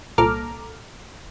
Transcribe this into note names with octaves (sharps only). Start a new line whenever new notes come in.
C2 A#2 A4 A#5 D6 F6